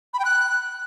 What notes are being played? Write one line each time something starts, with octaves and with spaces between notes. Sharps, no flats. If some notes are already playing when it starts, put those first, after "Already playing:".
B5
G5
F#6